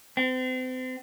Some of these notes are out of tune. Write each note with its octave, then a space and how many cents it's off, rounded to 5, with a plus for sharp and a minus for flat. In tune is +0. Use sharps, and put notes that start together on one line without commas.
C4 -35